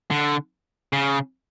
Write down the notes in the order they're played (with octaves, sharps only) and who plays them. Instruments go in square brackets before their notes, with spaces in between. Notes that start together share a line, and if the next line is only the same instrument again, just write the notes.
[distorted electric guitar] D3
C#3